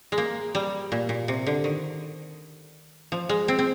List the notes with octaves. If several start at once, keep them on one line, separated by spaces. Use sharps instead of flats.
G#3
A#3
G3
A#2
A#2
C3
D3
D#3
F3
G#3
C4
C4